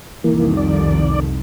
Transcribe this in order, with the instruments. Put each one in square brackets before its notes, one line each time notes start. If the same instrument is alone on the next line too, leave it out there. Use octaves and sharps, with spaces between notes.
[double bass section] C2 F2 D#3 [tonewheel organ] E3 A#3
[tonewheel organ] D5